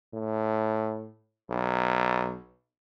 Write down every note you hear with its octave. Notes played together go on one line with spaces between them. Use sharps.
A2
B1